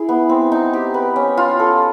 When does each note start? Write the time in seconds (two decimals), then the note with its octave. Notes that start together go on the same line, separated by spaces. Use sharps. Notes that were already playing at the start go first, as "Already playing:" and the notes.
Already playing: E4 G#4
0.09 B3
0.29 C4
0.52 D#4
0.73 G4
0.94 B4
1.16 C#4
1.37 F4
1.59 A4